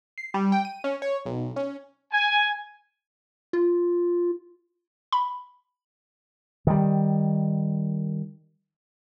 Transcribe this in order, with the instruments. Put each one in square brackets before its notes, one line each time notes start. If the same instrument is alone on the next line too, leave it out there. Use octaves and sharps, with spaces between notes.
[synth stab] C7
G3
G5
D#7
C#4
C#5
B1
C#4
[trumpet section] G#5
[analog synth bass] F4
[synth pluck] B5
[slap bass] D#3 G3